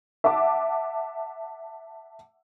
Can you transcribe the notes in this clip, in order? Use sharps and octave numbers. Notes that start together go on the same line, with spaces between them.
E5 F#5 A5 D6